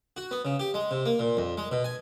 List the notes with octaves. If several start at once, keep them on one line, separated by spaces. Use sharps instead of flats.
F#4
B3
C#3
G4
G#3
C3
A#3
A#2
F2
G#3
B2
G#5